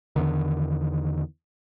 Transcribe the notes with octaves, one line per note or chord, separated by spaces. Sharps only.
E2 D3 D#3